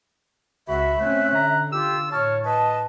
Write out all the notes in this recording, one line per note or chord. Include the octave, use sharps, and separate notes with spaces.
C#2 F#4 E5 B5
A3 C4 C#4 F#6
D3 A#5
F4 G4 E6
A2 C#5 A5 F6
B4 D#5 A5